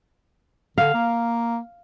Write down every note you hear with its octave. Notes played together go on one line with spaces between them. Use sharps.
D3 F5
A#3